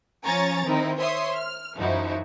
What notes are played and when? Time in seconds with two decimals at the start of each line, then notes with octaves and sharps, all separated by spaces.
0.24 F3 C#4 C#5 G#5 A#5 A6
0.65 D#3 C4 D#4 E4
0.97 C5 C#5 E5 C6 D#6
1.35 F6
1.76 F#2 E3 F3 D#4 E4 F#4